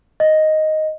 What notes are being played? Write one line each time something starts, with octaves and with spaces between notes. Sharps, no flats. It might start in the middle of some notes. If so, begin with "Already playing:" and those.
D#5